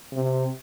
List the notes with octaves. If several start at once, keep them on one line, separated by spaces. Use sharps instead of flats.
C3